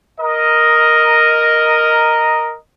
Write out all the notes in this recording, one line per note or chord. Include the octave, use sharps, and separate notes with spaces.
A#4 D#5